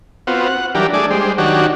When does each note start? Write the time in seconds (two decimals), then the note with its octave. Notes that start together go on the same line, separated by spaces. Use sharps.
0.27 B3 C4 F4 F#4
0.48 F#5
0.75 E3 F#3 G3 D4 G4 A#4
0.93 A3 D4 G#4 D5
1.11 G3 G#3 C5
1.38 D#3 F#3 D4 F#4 G4 C#5